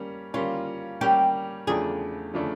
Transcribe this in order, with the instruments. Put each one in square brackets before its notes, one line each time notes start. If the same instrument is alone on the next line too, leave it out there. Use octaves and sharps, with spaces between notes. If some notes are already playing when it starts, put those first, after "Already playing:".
Already playing: [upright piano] G3 A#3 C#4
[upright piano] G3 A#3 C#4 [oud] F4
[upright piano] G3 A#3 C#4 [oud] G4
[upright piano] E2 C#3 F3 A3 D4 [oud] G#4
[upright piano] C#3 F3 A3 D4